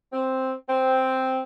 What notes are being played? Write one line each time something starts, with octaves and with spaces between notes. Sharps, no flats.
C4
C4